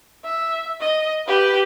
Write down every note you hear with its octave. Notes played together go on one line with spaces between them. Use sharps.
E5
D#5
G4 B4